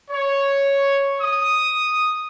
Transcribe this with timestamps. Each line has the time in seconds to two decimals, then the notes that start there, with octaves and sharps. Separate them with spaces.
0.10 C#5
1.22 D#6